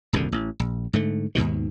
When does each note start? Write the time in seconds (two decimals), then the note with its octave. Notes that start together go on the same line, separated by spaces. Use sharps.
0.13 D#1 C2 F#2 D3
0.32 A1
0.60 A#1
0.93 G#2 D3 A3
1.35 D#2 G#2 B2 D#3